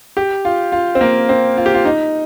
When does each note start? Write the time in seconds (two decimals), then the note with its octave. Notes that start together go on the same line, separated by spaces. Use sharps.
0.17 G4
0.45 F4
0.72 F4
0.95 C4
1.01 A#3
1.29 C4
1.57 F4
1.66 G4
1.74 F4
1.85 D#4